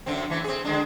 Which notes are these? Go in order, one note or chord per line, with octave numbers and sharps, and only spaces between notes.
F#2 D3 C4
E3 A3
C4 G#4
D3 G#3 D4